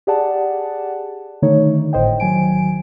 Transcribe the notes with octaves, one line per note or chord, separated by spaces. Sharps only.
G4 G#4 D5 F#5 A5
D3 D#3 A3 D#4 C#5
G#1 A2 C5 D#5 G5
D#3 F#3 G#5 D7